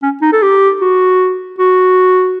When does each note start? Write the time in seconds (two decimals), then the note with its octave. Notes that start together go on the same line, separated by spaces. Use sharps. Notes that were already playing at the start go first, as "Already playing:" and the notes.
0.03 C#4
0.22 D#4
0.32 A4
0.42 G4
0.81 F#4
1.59 F#4